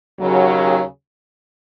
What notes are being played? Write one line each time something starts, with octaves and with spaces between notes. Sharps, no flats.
D#2 C#3 F#3